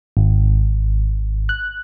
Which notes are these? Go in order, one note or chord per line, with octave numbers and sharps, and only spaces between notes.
G#1
F#6